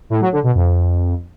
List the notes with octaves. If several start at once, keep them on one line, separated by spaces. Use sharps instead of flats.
A2
F#3
D3
B2
F2